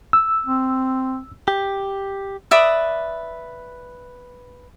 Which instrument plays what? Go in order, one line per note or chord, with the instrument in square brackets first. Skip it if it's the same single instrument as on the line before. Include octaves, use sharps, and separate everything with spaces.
[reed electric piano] E6
[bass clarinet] C4
[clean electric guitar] G4
[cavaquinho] B4 D5 E5 D#6